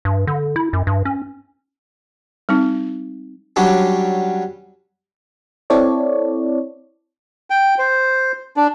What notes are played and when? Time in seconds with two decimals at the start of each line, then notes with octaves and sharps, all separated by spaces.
0.05 G2
0.27 D3
0.56 E4
0.73 F#2
0.87 G2
1.05 C#4
2.49 G3 C4 D#4
3.56 F#3 G3 C#4 D4
5.70 C4 E4 A4 C#5 D5
7.50 G5
7.79 C5
8.57 D4